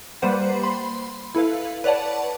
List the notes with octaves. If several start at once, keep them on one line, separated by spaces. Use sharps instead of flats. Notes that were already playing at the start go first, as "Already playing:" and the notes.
G3 A#3 B4 C5 F#5
B5 C6
E4 A4 B4 F5
B4 C#5 D5 F#5 A5